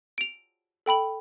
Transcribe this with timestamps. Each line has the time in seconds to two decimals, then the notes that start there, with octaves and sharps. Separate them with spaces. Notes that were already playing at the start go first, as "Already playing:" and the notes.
0.18 D7 F7
0.86 A4 G5 B5 F#7